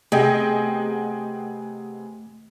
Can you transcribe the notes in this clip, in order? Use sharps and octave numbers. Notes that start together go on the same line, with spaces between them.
C3 A3 B3 G#4 D#5 G5